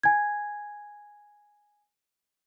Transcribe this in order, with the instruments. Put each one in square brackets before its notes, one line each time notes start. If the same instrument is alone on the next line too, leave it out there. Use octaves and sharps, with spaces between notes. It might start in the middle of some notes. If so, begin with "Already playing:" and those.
[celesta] G#5 G#6